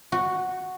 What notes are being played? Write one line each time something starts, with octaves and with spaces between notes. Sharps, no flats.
F#4